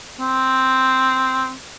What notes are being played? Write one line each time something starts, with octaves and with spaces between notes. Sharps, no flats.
C4